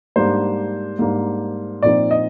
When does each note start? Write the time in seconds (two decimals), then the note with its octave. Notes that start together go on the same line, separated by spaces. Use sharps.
0.16 G#2 G3 A#3 D4 C5
0.99 G#2 G3 A#3 D4
1.83 A#2 F3 C4 D#4 D5
2.11 D#5